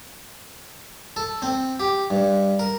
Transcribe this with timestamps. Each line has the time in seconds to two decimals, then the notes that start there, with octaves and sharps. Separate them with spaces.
1.16 A4
1.42 C4
1.80 G4
2.10 G2
2.59 A#4